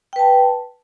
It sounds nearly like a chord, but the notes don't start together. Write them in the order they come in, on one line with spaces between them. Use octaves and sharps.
G5 B4 A5